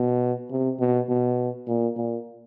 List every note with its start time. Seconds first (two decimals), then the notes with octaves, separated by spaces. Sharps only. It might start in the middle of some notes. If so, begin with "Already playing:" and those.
Already playing: B2
0.51 C3
0.80 B2
1.09 B2
1.67 A#2
1.97 A#2